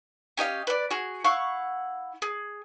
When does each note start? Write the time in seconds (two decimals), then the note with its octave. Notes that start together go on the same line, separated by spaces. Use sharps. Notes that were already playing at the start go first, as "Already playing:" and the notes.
0.37 C#4 G4 D#5 F5
0.67 B4 D5
0.90 F#4 G#4
1.24 E4 F5 F#5 C#6
2.22 G#4